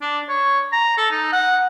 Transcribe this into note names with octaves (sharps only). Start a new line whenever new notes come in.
D4
C#5
A#5
A4
D#4
F#5